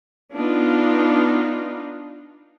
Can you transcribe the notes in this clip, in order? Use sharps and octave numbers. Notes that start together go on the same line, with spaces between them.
B3 D4 D#4 F4